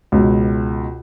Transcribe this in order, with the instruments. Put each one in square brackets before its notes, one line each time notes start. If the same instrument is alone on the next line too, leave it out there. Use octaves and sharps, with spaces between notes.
[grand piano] C#2 B2